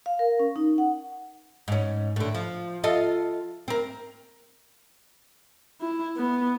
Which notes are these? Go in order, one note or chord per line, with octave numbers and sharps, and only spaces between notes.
F5
A#4
C#4
D#4
F#5
G#2 C#4
A2 D3
F3
F4 A4 D#5
C4 A#4
E4
B3